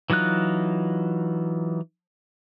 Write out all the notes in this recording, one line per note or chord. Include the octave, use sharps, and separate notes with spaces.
E3 F#3 D#4 F4 F#6